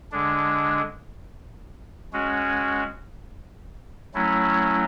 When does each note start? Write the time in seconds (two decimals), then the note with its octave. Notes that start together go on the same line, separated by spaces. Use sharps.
0.12 D3 G#3 D4
2.13 G#3 C#4 F#4
4.14 F#3 A3 C#4 E4